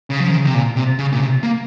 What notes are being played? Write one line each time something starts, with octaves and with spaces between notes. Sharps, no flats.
C#3
F3
D#3
C#3
C3
A#2
C3
C#3
A#2
C3
A#3